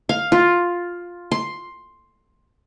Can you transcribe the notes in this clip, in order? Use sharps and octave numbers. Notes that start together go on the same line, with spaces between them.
F5
F4
C6